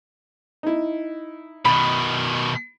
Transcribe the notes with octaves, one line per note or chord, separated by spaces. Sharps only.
D#4 E4
B2 D#3 B5 A6